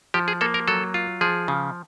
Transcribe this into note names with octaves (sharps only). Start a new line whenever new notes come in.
F3 G4
G#4
A#3 A4
A#4
F#3 A4
F4
F3 G#4
C#3